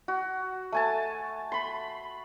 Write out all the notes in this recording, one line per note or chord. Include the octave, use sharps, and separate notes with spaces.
F#4
A3 G#5 A5
B5 C6